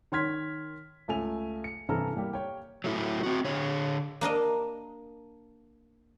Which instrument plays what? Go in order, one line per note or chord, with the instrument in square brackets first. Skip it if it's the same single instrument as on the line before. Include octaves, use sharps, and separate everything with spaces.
[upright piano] D#3 C#5 C6 F6 G#6 B6
C#2 A3 G#5 F7
C#7
G2 C3 E3 A4 A#5 F6
G3 A#3 G4
C#5 G5
[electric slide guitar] F#3 A3 E4
C4 F#4
D3 C#5
[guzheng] A#3 D4 A#4 D#5